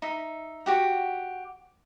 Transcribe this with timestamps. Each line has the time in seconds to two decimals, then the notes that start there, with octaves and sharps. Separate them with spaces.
0.02 D#4 E5
0.66 F#4 G4 F#5